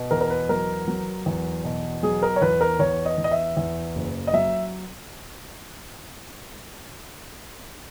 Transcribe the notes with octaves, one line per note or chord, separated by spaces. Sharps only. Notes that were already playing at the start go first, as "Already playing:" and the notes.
Already playing: B2
E2 A#4
A#4
B4
F#3 A#4
F#3
E2
B2
F#3 G#4
A#4
C#5
E2 B4
A#4
E2 C#5
D#5
E2
D#5
E5
E2
F#1
D#5
F#3 E5